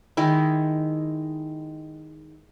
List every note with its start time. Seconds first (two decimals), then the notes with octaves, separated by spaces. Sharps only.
0.17 D#3 G#3 D#4 E4